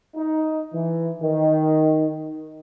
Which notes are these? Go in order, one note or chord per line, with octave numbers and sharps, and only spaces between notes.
D#4
E3
D#3